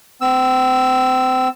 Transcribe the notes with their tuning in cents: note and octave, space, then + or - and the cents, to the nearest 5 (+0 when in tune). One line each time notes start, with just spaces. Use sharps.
C4 -35 E6 +0